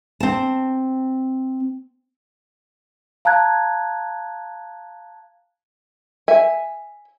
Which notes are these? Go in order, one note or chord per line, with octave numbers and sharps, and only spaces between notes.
C4 A5
F5 A5 A#5 F#6 G#6
E5 G#5